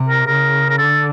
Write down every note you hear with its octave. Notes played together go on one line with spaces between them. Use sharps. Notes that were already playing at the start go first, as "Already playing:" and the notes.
Already playing: C3
A#4
C#3 A#4
A#4
D3 A4